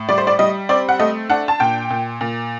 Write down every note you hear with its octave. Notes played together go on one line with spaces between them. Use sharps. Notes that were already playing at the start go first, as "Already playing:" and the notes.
Already playing: A2
G3 D5
C5
D5
G3 D#5
C4 D5
F#5
A3 D#5
D4 F#5
A5
A#2 G5
A#2
A#2